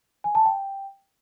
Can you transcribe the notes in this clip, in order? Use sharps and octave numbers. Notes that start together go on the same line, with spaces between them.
G#5
A5
G5